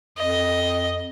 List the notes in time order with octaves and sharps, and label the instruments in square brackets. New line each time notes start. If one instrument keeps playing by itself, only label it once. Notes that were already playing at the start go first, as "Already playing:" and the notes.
[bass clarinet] F2 [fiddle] D#5